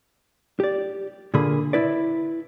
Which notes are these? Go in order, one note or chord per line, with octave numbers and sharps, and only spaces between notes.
G4 D5
A#2 D3 A#3 G#4 B5
E4 B4 D5